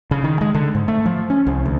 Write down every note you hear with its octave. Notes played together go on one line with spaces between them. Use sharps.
C#3
D#3
G#3
D3
G#2
A3
F3
C#4
C2
D2